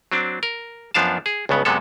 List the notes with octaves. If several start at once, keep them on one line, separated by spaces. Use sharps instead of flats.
F#3 C4 D4
A#4
F#2 F3 B3 D4 F5 A5
G#4
C#2 G2 C#3 B3
F#2 C3 G#3 B3 A4